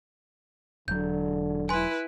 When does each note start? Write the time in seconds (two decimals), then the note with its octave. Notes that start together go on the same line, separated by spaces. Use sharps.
0.88 E1 D3 F#3 G6
1.69 E4 B4 G#5 C6